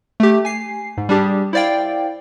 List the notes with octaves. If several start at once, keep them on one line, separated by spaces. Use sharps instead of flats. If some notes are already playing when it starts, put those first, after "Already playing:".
A3 G4
G#5 C7
G#2
G3 D4 G4 G#4
E4 C5 D5 F5 G5